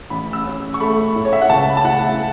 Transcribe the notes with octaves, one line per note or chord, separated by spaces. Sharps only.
A1 B5
E6
C#4
C#6
A3 B5
A2
C#5
E5
F#5
C#2 A5
B5
A5
E4 F#5